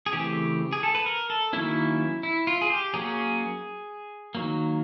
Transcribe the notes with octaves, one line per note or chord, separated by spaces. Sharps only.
G#4
C#3 E3 A3 C4 G4
G#4
A4
B4
A#4
A4
D#3 F#3 A#3 C#4 E4
E4
F4
G#4
G4
F#3 A#3 C#4 G#4
D#3 F#3 A#3